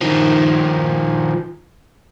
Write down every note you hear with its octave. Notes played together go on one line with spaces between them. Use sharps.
D#3 F3